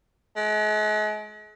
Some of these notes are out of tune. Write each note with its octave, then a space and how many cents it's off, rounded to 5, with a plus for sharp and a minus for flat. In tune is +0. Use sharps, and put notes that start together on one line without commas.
G#3 +40